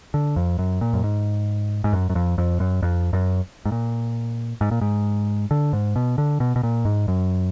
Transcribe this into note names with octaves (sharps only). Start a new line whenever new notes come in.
D3
F2
F#2
A#2
F#2
G#2
G#2
F#2
F#2
F2
F2
F#2
F2
F#2
G#2
A#2
G#2
A#2
G#2
D3
G#2
B2
D3
B2
B2
A#2
G#2
F#2